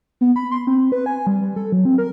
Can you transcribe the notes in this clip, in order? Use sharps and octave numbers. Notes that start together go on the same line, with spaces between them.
B3
B5
C6
C4
B4
G#5
G3
G3
A4
F#3
C4
A#4